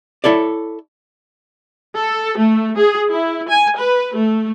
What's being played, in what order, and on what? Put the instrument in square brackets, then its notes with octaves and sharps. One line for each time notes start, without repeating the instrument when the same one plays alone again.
[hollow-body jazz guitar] E4 A4 C#5 D5
[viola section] A4
A3
G#4
E4
G#5
B4
A3